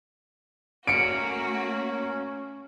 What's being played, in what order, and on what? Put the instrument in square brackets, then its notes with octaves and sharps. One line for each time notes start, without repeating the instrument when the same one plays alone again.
[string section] A3 A#3 F#4 [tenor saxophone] C#4 [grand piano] C#7 D7